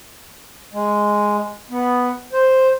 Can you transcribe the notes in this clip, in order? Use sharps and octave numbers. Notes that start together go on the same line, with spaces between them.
G#3
B3
C5